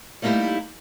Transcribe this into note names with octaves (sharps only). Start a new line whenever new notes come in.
G3 A3 A#3 D#4 E4 G4